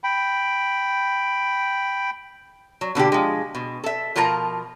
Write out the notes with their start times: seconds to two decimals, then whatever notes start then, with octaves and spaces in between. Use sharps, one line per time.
0.04 G5 B5
2.81 F#3
2.95 B2 D3 A#3 G4
3.12 F3 G#3
3.55 B2
3.84 A4 E5
4.16 B2 F3 F4 A#4 A5 A#5